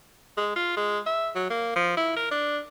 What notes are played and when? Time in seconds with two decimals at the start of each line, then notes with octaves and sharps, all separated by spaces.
0.37 G#3
0.56 F4
0.77 G#3
1.06 E5
1.35 F#3
1.50 A#3
1.76 F3
1.97 E4
2.16 A#4
2.31 D4